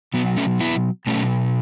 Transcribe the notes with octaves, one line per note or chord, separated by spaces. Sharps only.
B2 F#3 B3
A3 C#4
B3 E4
B2 F#3 A3 C#4